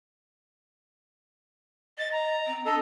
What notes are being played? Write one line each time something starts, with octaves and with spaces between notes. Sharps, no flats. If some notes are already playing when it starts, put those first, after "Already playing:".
D#5 A6
A#5
C4
D4 A4 D#5